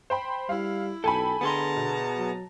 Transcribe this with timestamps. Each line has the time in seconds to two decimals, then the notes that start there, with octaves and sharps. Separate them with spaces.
0.10 C5 G5 B5
0.49 G3 E4 F5
1.04 B1 A4 G5 G#5 B5
1.41 D3 B3 G#4 A5 A#5 C6
1.76 B2
2.18 F#3